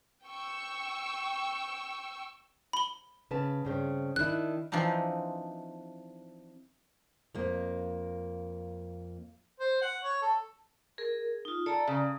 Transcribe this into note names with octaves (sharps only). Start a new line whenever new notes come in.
G5 C#6 E6
B5 G7
C#3 B4 A5
G2 C#3 C4
D#3 D4 E4 F#6
E3 F3 C4 D4 D#4
F2 A#3
C5
F#5
C#5
A4
G#4 A#4
D#4 F4
A4 D5 A#5
C#3